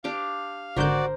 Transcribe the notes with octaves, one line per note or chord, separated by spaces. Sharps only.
D4 G4 F5 D6
G#1 D3 F#4 A#4 C5 D5 G6